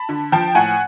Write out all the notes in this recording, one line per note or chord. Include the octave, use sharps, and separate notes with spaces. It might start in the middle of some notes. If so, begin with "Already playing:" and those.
Already playing: A5 B5
D3
F3 G5 A5
A2 F#5 G#5